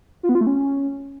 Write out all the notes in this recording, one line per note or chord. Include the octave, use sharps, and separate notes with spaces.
F4
B3
F4
A3
C#4